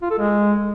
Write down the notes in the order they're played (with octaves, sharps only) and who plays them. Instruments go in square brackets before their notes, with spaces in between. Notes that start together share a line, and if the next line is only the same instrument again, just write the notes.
[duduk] F4
A4
G#3